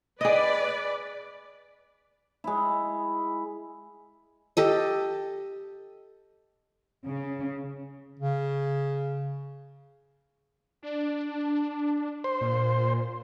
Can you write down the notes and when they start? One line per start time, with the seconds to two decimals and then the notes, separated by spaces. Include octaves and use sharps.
0.21 G#4 B4 D5 D#5
2.44 G#3 E4
4.57 G4 A4 D#5
7.06 C#3
8.19 C#3
10.83 D4
12.24 C5
12.41 A#2